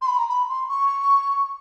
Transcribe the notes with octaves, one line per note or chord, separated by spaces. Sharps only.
C6
B5
A#5
B5
C6
C#6